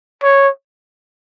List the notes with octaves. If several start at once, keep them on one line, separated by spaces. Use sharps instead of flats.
C#5